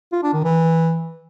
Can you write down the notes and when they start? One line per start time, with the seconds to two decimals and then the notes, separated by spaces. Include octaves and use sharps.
0.13 F4
0.23 D4
0.34 D#3
0.44 E3